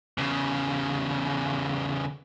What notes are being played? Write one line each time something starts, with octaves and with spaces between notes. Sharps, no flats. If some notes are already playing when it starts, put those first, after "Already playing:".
E2 C#3